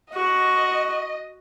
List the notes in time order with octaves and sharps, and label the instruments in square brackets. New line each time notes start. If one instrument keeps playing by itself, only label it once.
[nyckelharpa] F#4 [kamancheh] D#5